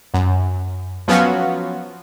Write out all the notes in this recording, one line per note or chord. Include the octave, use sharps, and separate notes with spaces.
F#2
F3 F#3 B3 C#4 F4 F#4